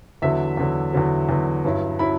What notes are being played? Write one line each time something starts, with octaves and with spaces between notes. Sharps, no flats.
E2 D3 F#3 E5
E2 D3 F#3
E2 D3 F#3
E2 D3 F#3
G2 F#3 C#4 E4
F#3 C#4 E4 B5